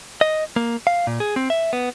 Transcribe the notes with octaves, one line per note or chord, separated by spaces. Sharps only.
D#5
A#3
F5
A#2
G#4
C4
E5
B3